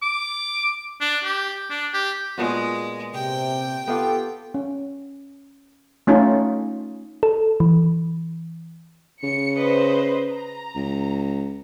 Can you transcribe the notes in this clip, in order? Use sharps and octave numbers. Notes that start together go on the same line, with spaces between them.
D6
D4
G4
D4
G4
A#2 G#3 B3 F#4
C3 G5
B3 F4 G4 A4
C#4
A3 C#4 D#4 F4 C#5
A4
E3
C#3 C#7
B4 C5 D#5
A#5
C#2